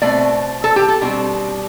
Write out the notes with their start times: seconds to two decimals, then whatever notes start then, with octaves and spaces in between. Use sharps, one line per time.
0.02 B2 A3 C4 D5
0.64 A4
0.76 G4
0.88 A4
1.01 B2 G3 C4 D4